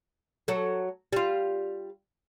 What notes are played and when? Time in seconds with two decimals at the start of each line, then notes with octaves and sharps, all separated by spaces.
0.48 F#3 A4
1.13 G3 F4